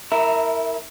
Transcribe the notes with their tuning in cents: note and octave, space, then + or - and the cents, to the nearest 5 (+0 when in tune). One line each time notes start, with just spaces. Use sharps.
E4 -25 A#4 -15 E5 +0